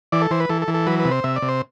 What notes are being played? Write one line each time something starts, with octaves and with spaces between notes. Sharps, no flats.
E3 D5
A4
E3 C5
B4
E3 A4
A4
E3
A4
F#3 B4
B4
C3
C5
C3 E5
D5
C3
C5